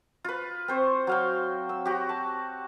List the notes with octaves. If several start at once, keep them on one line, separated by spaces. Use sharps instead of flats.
F4 B4
C4 C5 C#6
F#3 F5 G5
E6
F#4 G4
A5